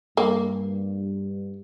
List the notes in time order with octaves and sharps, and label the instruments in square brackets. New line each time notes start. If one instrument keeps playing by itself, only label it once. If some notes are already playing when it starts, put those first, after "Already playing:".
[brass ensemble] G2 [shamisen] A#3